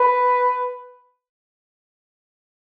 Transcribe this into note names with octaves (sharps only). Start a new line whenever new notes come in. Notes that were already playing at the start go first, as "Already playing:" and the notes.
Already playing: B4